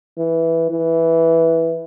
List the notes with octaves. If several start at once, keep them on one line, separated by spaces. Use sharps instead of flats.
E3
E3